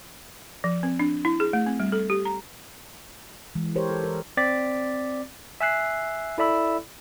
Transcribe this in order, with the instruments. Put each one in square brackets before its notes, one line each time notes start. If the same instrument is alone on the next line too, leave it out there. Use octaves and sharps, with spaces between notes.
[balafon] F3
C4
D4
E4
G#4
A3
C4
G3
A4
G4
A#5
[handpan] E3 G#3
G4 A#4 C5 C#5
A4
A#4
[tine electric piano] C4 D5 D6 A6 B6
E5 G#5 E6 F#6 C7
E4 A4 D5 E5 B5 E6